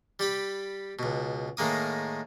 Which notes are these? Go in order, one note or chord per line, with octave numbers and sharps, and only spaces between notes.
G3 G4 B5
C#2 B2
A2 D#3 G#3 A#3 D#6